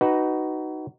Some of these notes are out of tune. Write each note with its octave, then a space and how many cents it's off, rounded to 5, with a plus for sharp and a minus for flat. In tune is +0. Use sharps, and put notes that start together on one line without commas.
D#4 -5 F#4 +20 B4 +0